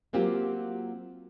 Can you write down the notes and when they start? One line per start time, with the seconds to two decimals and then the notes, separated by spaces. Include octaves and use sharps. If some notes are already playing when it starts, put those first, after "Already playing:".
0.13 F#3 A#3 C4 F4 G4